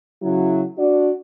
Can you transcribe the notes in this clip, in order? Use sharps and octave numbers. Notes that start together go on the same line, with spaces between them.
C#3 F#3 E4
D4 F#4 D5